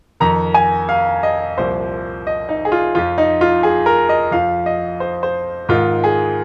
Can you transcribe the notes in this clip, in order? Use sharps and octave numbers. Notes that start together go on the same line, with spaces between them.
F2 D#3 A#5
G#5
F5
D#5
C2 A#2 F3 C5
D#5
D#4
G#4
F4
F2 F3 F4
D#4
F4
G#4
A#4
D#5
F2 F3 F5
D#5
C5
C5
G#2 D#3 F4
G#4